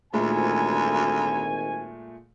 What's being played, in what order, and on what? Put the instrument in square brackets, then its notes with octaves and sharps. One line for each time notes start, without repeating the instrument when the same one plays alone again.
[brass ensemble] G#1 G#5 [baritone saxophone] D2 [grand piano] A#2 G#3 A3